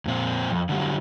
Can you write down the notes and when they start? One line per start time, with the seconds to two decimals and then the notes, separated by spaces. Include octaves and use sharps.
0.06 F2 A#2 C4 C5
0.50 F2
0.69 D3 F#3 G3